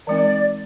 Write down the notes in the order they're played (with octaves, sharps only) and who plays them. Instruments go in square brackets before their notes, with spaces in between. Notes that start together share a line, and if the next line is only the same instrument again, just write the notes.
[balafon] E3 G#3 C4 D#4 [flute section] D5